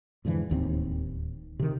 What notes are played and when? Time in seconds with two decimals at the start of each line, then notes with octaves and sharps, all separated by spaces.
0.25 F2 G#2 D3 E3
0.50 D1 D#2 F3 C4
1.59 C3 D#3